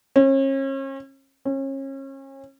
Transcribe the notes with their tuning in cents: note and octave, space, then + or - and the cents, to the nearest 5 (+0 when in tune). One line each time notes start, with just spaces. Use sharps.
C#4 -40
C#4 -35